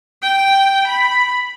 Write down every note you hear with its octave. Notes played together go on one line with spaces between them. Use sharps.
G5
B5